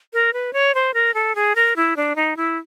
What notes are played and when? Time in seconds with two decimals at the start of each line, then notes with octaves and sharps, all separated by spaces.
0.13 A#4
0.33 B4
0.53 C#5
0.75 C5
0.94 A#4
1.14 A4
1.35 G#4
1.55 A#4
1.76 E4
1.96 D4
2.16 D#4
2.37 E4